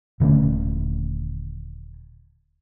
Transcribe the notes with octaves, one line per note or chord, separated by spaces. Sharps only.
D#1 D3 A3 C#4